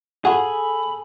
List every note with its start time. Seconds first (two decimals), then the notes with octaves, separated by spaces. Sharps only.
0.25 F4 F#4 G#4 A4 F#5 B5